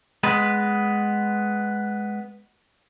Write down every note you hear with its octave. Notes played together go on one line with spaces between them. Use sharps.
G#3 B3 B4